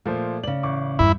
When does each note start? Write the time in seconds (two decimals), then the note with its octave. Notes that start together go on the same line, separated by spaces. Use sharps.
0.06 A#2 F3 A3 C5
0.44 C#3 D5 F#7
0.63 A1 C#6 D6
0.99 E2 G2 E4